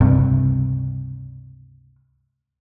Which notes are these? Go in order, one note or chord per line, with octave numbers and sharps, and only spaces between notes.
C#2 G2 C3